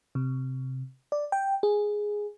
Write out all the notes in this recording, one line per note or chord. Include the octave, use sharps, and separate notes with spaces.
C3
D5
G5
G#4